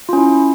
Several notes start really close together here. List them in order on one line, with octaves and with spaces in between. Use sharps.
F4 C#4 E4